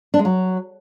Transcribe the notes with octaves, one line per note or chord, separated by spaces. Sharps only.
D4
G#3
F#3